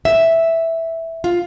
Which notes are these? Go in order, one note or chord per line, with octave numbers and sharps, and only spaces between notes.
E5
F4